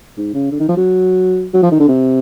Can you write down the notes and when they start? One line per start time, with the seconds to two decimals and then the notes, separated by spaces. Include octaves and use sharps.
0.17 G#2
0.34 C#3
0.51 D3
0.60 D#3
0.68 F3
0.77 F#3
1.53 F#3
1.63 F3
1.71 D#3
1.80 D3
1.88 C3